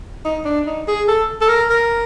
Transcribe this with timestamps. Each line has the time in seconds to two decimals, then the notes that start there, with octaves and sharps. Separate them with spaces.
0.25 D#4
0.45 D4
0.66 D#4
0.88 G#4
1.08 A4
1.41 A4
1.49 A#4
1.70 A#4